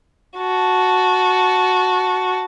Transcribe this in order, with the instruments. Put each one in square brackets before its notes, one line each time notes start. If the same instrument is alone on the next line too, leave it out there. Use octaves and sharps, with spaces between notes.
[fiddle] F#4 A5